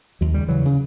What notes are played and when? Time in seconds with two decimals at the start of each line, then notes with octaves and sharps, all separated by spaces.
0.21 D#2 F#3
0.34 C#3 G3
0.48 C#3 E3 F#3
0.65 C#3